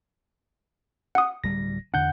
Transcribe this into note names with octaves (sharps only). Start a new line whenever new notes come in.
F#5 D#6
D1 G3 A#6
E2 D3 D4 F#5 G6